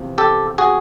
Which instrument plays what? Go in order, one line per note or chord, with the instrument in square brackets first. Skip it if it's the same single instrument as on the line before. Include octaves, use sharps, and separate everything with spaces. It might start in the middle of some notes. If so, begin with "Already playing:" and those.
Already playing: [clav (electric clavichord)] E2 C3 F3
G4 A4
F#4 G#4